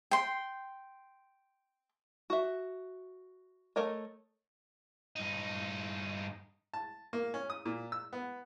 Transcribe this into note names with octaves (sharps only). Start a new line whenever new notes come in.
G5 C6
F#4 E5
A3 A4 A#4 C#5 D#5
G2 D#4
A5
A#3
C#4
D#6
A#2
E6
B3